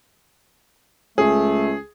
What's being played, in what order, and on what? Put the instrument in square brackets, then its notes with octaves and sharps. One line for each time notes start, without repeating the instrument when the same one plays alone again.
[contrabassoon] C#2 [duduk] A3 [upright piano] G#4